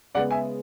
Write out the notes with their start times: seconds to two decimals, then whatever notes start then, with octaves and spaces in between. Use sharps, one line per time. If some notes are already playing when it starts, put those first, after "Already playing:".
0.15 C#3 G#3 B3 D5 F#5
0.31 E5 G#5